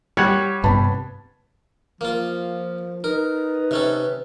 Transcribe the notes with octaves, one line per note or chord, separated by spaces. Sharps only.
G3 C#5 F#5 G#6
G2 C3 B3 B4 A5 B5
F3 A#3 F4
D#4 A#4 B4
C3 C#4 A4